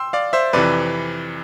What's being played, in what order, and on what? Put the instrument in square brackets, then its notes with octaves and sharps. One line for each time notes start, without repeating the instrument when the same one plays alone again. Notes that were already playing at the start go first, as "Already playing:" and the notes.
Already playing: [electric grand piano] G5 C6 E6
D5 F5
C5 E5
F2 C3 E3 B4 D5